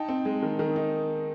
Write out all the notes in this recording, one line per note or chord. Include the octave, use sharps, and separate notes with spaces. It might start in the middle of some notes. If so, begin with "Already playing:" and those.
Already playing: D#4 G5 A5
C4
G#3
D#3
D#3
D#4